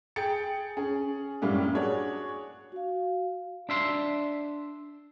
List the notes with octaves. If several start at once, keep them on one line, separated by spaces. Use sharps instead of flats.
G#4 G5 A6 C#7
C#4 G#4
F#2 A2 G3 A#3 C#4
D4 F#4 G#4 C#5
F#4 F5
D4 E5 C6